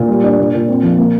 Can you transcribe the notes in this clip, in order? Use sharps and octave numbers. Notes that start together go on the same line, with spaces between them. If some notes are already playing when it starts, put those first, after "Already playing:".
Already playing: A#2
G3
D4
A#2
A#2
C4
F3
A#3